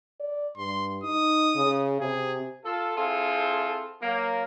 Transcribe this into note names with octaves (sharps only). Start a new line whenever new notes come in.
D5
G2 C6
D#4 D#6
C#3
C3 G#4
F4 A4
C4 E4 F4 G#4 A4
F#3 A#3